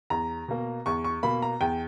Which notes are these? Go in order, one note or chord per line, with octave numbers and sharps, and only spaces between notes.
E2 A#5
B2 A#3
E2 C#6
C#6
B2 A#3 B5
A#5
E2 G5